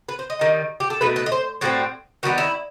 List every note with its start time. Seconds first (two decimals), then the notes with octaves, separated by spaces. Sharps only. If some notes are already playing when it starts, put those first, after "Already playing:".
0.09 B4
0.19 C5
0.30 D#5
0.39 D#3 G3 D#4
0.80 G4
0.90 A4
1.01 B2 A3 D#4 B4
1.16 B4
1.26 D#5
1.32 C5
1.61 A2 G3 C4 F#4
2.23 D#3 G3 B3 F#4
2.38 E4